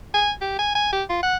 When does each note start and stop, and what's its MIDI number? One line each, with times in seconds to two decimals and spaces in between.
0.14 0.31 80
0.41 0.54 67
0.59 0.71 80
0.75 0.91 80
0.93 1.03 67
1.09 1.21 65
1.23 1.36 78